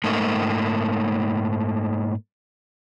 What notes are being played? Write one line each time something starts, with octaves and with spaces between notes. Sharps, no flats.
G#2 A3 A#3 D#4